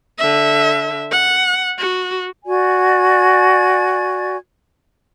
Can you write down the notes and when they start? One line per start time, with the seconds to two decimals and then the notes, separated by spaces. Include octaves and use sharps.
0.19 D3 E5
1.12 F#5
1.79 F#4
2.45 F#4 D5 G#5 G#6